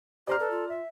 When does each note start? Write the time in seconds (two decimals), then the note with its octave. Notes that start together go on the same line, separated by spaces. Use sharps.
0.27 G4 C5 D5 A#5 F6
0.40 A4 B4
0.51 F4
0.69 E5